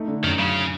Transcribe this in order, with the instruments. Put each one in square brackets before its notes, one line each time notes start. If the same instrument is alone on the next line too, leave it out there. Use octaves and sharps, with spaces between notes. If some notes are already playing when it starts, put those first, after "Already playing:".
Already playing: [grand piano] A3 D#4
D3
[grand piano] F#2 [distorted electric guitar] D#3
[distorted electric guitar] C#3 [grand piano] F#3